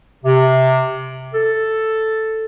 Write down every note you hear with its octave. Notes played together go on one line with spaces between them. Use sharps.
C3
A4